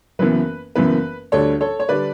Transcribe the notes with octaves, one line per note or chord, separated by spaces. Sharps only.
F#1 F#2 E3 B3 B4
F#1 F#2 E3 B3 B4
D2 D3 G3 D4 A4 C#5
A4 C#5
C#5
D3 G3 D4 B4 D5